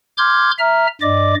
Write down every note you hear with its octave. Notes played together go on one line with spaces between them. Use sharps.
C6 D6 F6 G6 G#6
E5 A#5 F6
G2 D5 D#5 D6